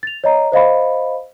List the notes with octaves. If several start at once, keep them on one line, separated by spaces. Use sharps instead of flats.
A6 F7
C#5 D#5 A#5
C5 D#5 F5 B5